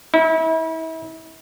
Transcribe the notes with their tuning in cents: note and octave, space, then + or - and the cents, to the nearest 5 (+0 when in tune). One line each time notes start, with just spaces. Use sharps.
E4 -35